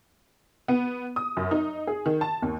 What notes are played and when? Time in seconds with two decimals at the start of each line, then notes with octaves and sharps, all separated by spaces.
0.68 B3
1.16 D#6
1.37 F#2
1.51 D#4
1.87 G#4
2.06 D#3
2.21 A5
2.42 D#2